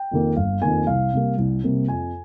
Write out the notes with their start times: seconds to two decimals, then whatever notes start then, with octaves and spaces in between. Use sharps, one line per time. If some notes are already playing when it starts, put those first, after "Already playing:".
Already playing: G5
0.11 F2 D#3 A#3
0.36 G1 F5
0.62 F2 D#3 A#3 G#5
0.87 C2 F5
1.13 C3 G3 A#3
1.38 C2
1.63 C3 G3 A#3
1.88 F2 G#5